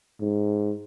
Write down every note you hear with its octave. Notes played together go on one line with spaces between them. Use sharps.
G#2